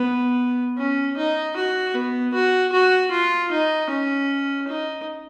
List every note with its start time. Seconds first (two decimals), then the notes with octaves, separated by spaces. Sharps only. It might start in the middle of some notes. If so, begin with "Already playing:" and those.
Already playing: B3
0.78 C#4
1.17 D#4
1.56 F#4
1.94 B3
2.34 F#4
2.72 F#4
3.11 F4
3.51 D#4
3.89 C#4
4.68 D#4